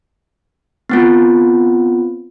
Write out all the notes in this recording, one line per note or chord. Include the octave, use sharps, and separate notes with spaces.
B3 C4 F4